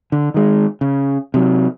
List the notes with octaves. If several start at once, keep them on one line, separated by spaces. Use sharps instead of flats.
D3
D#3 G#3
C#3
C3 F#3